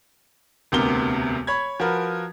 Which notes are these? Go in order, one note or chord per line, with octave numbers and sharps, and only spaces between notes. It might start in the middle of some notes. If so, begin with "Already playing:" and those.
E1 D2 C3 B3 A#4 G7
C#5 B5 G#6
F3 F#4 A#4 B4